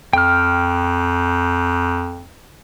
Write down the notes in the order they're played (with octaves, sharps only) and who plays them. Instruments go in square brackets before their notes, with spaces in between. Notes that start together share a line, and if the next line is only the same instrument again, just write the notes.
[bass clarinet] F2 [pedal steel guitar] G5 F6